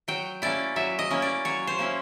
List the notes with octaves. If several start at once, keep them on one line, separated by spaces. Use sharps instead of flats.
F#3 G5
A#3 C#4 E4 D5
F#3 E5
D#5
A#3 C#4 E4
D5
F#3 C#5
C5
A#3 C#4 E4